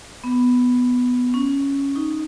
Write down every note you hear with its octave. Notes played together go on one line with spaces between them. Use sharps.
B3
C#4
D#4